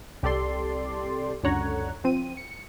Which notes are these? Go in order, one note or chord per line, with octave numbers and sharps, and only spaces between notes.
C2 G4 A4 D5 C6
C#2 F#2 D3 C#5 F#5 A#5
F3 C4 D#7
C#7